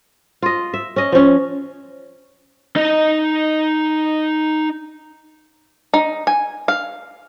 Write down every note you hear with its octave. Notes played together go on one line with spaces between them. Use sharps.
F4 D#5
E5
C#4 D#5
F3 C#4
D#4 D#5
D#4
G#5
F5